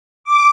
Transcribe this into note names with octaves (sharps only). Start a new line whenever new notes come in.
D6